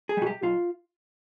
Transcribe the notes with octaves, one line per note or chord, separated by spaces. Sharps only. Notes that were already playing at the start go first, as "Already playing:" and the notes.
G#4
B2 G3 F#4
G4
B1 F4